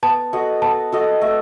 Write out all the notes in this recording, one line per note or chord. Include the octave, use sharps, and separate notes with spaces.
B3 A5
F#4 A4 D#5
B3 A5
F#4 A4 D#5
A3